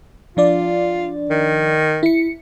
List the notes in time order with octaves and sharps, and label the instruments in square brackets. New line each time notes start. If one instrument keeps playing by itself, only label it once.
[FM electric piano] F3 D4 D5 [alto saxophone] F4
[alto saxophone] D#3
[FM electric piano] E4 C#7